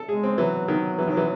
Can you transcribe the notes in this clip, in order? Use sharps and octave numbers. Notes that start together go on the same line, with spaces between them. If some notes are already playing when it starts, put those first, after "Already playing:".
Already playing: A4
G#3 G#4
C4
E3 F#3
D#3
E3
D#3
E3